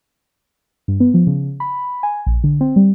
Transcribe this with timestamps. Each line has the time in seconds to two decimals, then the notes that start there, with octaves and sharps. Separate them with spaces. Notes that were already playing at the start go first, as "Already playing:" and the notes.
0.88 G2
1.00 B3
1.14 F3
1.27 C#3
1.60 B5
2.03 G#5
2.27 A#1
2.44 D3
2.61 C4
2.76 G3